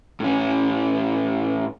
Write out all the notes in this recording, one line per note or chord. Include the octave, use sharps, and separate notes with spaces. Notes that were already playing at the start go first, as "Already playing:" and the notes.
A2 C#4